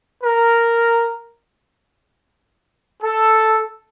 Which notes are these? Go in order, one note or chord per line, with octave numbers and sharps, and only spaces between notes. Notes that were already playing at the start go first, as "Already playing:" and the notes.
A#4
A4